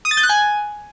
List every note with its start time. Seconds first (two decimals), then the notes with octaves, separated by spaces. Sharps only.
0.05 D#6
0.11 A6
0.17 G6
0.23 F#6
0.29 G#5